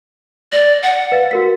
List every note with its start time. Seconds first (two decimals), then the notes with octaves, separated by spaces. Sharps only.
0.52 D5 A#6
0.83 F#5
1.12 B4 F5 A6
1.31 F#4 A#4 B6